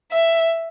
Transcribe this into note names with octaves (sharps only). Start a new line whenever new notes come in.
E5